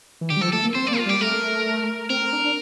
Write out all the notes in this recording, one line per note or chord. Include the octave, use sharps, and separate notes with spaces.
E3
D3 G4
G3
F3 A4
A3 A4
A#3
C4 C5
A#3 D5
F4
G3 G4
A3 A#4
C4 A#4
C4
D4
D4